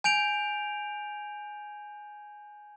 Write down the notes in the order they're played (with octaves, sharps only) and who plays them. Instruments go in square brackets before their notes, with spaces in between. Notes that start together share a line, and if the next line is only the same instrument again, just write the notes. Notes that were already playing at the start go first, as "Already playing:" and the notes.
[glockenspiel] G#5 G6 D7 F7